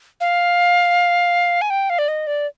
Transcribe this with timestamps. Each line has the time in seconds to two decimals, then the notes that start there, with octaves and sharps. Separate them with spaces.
0.20 F5
1.61 G#5
1.70 G5
1.90 F5
1.98 D5
2.08 D#5
2.27 D5